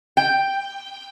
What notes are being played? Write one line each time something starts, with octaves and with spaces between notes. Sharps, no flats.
G5